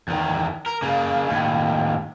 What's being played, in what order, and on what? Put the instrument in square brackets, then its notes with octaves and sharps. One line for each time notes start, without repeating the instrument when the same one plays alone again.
[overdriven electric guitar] E2 D#3
A#4
C#3 A#3
D#2 A2